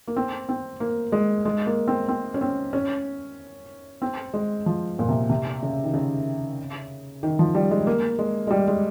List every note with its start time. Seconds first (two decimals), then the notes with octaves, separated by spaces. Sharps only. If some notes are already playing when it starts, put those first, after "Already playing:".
0.08 A#3
0.17 C4
0.49 C4
0.80 A#3
1.12 G#3
1.45 G#3
1.66 A#3
1.88 C4
2.08 C4
2.34 C#4
2.41 C4
2.73 C#4
4.02 C4
4.34 G#3
4.66 F3
4.99 A#2
5.09 C3
5.29 C3
5.63 C#3
5.84 D#3
5.94 C#3
7.23 D#3
7.39 F3
7.55 G3
7.71 G#3
7.87 A#3
8.19 G#3
8.47 G#3
8.51 G3
8.68 G#3